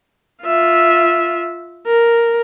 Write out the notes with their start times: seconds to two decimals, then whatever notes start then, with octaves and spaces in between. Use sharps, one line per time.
0.44 F4 E5
1.87 A#4